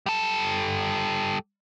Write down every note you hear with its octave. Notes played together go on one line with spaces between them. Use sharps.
G3 A4